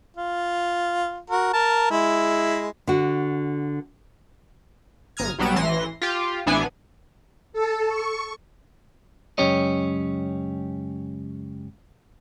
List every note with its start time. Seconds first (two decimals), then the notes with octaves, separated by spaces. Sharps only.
0.17 F4
1.30 F#4 A#4
1.53 A#4 A5
1.91 G#3 E4
2.87 D3 F#4
5.17 G1 A#5 D#6 F6 G#6
5.38 B1 F#3 G3 B3 D7 E7
5.56 A1 E3 C6 A#6
6.02 F4 G4
6.46 A1 E3 B3 D4 G#5
7.53 A4
7.87 C#6
9.38 C#2 F#2 C#4 G4 C#5 D#5